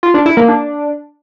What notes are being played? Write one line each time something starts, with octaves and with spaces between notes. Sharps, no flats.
F4
D4
E4
A#3
D4